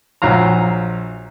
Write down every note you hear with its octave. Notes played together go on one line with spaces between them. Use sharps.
A#1 F#3 F5 A#5